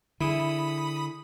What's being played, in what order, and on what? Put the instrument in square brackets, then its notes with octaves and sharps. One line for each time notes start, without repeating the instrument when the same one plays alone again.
[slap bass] D3 [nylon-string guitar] E4 G#4 [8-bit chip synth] B5 D#6